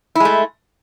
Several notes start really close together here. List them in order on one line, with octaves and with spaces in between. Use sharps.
E4 G#3 A3